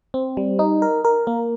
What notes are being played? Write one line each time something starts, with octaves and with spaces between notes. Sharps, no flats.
C4
G3
D#4
A#4
A#4
A#3